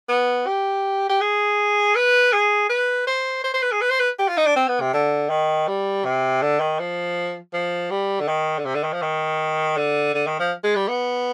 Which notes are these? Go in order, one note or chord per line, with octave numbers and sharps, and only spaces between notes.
B3
G4
G4
G#4
B4
G#4
B4
C5
C5
C5
B4
G#4
B4
C5
B4
G4
F4
D#4
D4
C4
B3
C3
D3
D#3
G3
C3
D3
D#3
F3
F3
G3
D3
D#3
D3
C3
D3
D#3
F3
D#3
D3
D3
D#3
F3
G#3
G3
B3